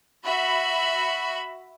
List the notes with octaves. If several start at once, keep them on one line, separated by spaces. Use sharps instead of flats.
F#4 E5 B5